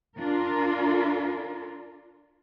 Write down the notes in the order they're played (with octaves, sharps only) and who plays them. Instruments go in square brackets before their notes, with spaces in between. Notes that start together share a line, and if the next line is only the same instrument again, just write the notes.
[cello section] D4 F4 A#4